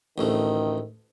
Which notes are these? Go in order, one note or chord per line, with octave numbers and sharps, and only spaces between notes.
A1 D2 D#3 A3